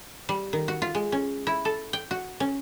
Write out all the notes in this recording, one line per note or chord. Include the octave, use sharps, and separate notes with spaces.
G3
D#3
F#4
F4
G#3
C#4
E4
A4
G5
F#4
C#4